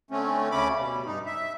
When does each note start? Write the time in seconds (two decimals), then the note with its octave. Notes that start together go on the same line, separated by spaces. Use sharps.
0.11 D3 A3 C4 C#4
0.51 D2 C#3 A3 C#4 B5 D6
0.77 B2 G3
1.06 G2 D#4
1.26 E5